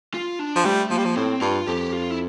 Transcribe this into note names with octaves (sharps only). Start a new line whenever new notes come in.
F4
D4
F3
G3 A3
F3 A#3
G3
F3
A2 C4
G2 F4
F2 G4
F4
E4